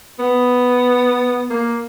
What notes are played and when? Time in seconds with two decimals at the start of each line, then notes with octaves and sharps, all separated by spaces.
0.19 B3
1.50 A#3